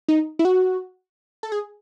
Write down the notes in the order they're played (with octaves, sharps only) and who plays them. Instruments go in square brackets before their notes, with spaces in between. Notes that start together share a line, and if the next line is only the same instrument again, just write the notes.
[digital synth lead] D#4
E4
F#4
A4
G#4